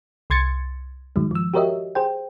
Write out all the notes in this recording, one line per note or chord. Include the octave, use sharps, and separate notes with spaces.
C2 C6 G#6 A6 C#7
G2 D#3 F#3 G#3
F3 E6
F#4 G4 A#4 C#5 D#5 E5
G#4 C5 G5